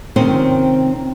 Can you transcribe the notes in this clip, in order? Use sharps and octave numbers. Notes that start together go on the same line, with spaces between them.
C3 D#3 C4 C#4 F4 C5